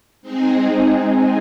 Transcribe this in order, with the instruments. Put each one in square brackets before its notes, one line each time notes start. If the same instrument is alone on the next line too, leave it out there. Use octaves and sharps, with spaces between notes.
[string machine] G#3 C4 D#4 G#4